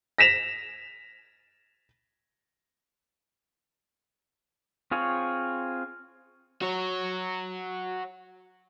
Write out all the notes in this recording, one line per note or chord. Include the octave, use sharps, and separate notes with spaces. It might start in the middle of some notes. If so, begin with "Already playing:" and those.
A#6 B6 E7 F7
C4 F4 G#4 C#5
F#4 C#5